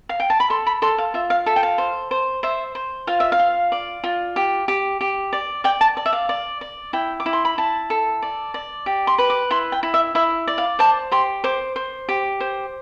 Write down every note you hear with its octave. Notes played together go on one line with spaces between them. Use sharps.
F5
G5
A5
B5
A4 C6
B5
A4 C6
F5
F4 E5
F5
A4 E5
G5
F5
C5
C5
C5 E5
C5
F4 F5
E5
F5
F4
D5
F4
G4
G4
G4
D5
D5 G5
A5
D5
E5
F5
D5
D5
E4 G5
D6
E4
C6
B5
E4 A5
A4
D5
D5
G4
C6
B4
D6
E4 C6
G5
E4
E5
E4 E5
D5
F5
C5 A5
G4 C6
C5 D6
C5
G4
C5